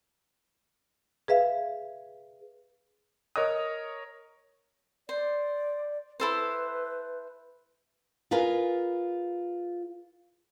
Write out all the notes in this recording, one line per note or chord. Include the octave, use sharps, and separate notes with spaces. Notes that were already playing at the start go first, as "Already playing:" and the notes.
G#4 B4 E5 F5
A#4 C#5 D#5 D#6
C5 D5
E4 A4 B4 C5
F4 G#4 A#4 B4 F5